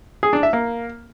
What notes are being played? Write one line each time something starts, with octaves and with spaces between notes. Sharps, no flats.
G#4
D4
E5
A#3